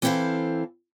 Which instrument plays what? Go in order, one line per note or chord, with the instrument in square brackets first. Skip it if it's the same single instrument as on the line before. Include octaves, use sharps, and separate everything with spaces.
[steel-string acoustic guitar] E3 C4 E4 A4 C5 F5